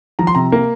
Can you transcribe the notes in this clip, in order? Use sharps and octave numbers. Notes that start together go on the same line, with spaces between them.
F3 A#5
C6
C3 A#5
A#3